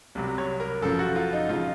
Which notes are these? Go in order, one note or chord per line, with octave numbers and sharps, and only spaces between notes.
C2 C3 F#3
C#5
A#4
F#1 F#2 F3 A4
F#4
F4
D#4
C#3 F3 F4